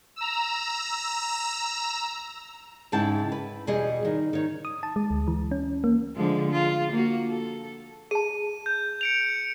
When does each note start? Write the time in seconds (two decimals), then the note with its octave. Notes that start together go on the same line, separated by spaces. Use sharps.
0.16 A#5 E6
2.92 G#2 C#3 E4 G5 A5
3.32 B4
3.67 E2 B2 G3 G#4 D#5
4.05 D#3
4.33 D#3 C#5
4.65 D#6
4.83 A5
4.96 G#3
5.10 D2
5.28 E3
5.51 C#4
5.84 A#3
6.16 D3 F3 G#3
6.52 F4
6.92 A#3 F#4
7.28 A4
8.11 G#4 A5 D#7
8.66 G6
9.01 C#7 D7 F7